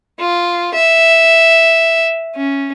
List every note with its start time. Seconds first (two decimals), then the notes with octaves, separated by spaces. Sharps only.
0.19 F4
0.74 E5
2.36 C#4